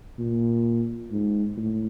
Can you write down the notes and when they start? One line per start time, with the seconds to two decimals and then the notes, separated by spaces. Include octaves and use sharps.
0.19 A#2
1.11 G#2
1.57 A2